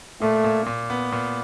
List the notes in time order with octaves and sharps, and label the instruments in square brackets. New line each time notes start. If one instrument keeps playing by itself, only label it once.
[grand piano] A#2 [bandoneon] A3
[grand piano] A#2
A#2
B3
A#2